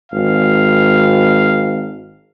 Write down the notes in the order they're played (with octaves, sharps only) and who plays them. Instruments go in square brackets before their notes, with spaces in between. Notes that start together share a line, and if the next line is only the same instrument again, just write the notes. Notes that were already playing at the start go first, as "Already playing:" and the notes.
[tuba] G#1 [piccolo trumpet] F5